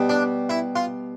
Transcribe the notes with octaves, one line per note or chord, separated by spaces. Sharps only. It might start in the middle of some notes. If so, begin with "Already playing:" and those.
Already playing: B2 G3
D4
E4
F4